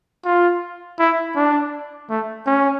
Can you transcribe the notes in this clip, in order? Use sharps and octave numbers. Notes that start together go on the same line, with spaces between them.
F4
E4
D4
A3
C#4